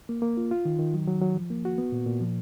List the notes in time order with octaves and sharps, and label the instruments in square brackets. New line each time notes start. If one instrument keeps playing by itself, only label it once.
[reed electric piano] A#3
A#3
F4
F4
D#3
D#3
F#3
F#3
F#3
F3
A#3
F#4
B3
A#2
A#2
F3